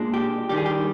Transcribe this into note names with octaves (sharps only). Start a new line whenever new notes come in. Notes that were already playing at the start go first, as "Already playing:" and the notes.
Already playing: A#2 G#3 D4
G4
D#3 G3 D4 G4
G#4
G4